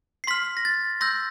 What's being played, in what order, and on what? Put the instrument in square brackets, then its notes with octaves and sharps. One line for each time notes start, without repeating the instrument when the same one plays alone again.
[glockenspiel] C7
C6 F6 B6
A#6
A6
C6 E6 G6 A#6